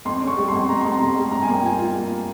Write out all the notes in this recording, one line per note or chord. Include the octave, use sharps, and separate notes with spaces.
F2 C6
C#4
C#6
G3
C6
F2
F2 A#5
F2 C6
A#5
C3
G3
G2 A#5
A#3 G#5
G5
F4 G#5
F4
A#3